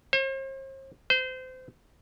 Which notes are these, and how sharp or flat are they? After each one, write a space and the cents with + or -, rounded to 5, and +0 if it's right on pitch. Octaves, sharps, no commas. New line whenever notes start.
C5 +45
C5 -25